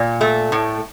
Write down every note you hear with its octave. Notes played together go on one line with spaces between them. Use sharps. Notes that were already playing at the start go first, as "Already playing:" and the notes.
Already playing: A#2
A3
A2